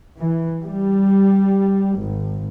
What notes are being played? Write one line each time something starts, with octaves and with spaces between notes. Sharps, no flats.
E3
G3
G#1